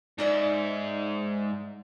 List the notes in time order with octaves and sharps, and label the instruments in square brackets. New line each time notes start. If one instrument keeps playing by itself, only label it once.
[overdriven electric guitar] G#2 [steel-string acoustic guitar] D#4 D5 E5